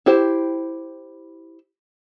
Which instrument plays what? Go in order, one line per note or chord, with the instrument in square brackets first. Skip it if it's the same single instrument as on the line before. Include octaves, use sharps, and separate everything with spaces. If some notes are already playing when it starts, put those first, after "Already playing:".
[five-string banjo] E4 G4 C5